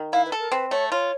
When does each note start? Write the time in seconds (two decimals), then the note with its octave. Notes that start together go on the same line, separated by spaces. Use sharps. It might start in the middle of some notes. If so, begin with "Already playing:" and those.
Already playing: D#3
0.12 E4 F5
0.25 B4
0.32 A4
0.39 A#4
0.52 C4 B4
0.71 A3 C#5
0.91 F4 C#5